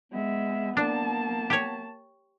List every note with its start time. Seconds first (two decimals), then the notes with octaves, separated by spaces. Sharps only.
0.12 G#3 B3 E5
0.77 A#3 D4 A5
1.50 G4 C#5